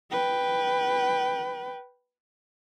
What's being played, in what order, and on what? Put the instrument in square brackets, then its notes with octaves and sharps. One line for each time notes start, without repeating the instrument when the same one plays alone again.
[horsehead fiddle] B4 G5